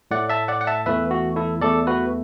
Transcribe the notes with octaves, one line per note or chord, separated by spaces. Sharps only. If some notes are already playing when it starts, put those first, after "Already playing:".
A2 A3 D5 F#5
E5 A5
D5 F#5
F#5
E5 A5
E2 E3 A3 B4 E5
F#4
E4 A4
E2 E3 A3 A4 D5
F#4 B4